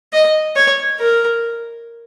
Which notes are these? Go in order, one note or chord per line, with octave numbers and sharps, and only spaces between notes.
D#5
C#5
A#4